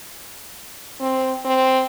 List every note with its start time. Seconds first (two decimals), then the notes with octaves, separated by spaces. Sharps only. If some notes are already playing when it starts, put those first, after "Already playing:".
1.00 C4
1.45 C4